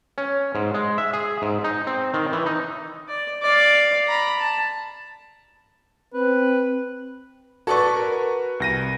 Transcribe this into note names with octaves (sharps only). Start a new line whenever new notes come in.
C#4
G#2
G#3
E5
G#4
G#2
D#4
C4
D#3
E3
D#4
D5
D5 F5
A#5 B5
A5
C4 B4
F#4 A4 B4 D5 C#6
A#4
C2 A#6 D#7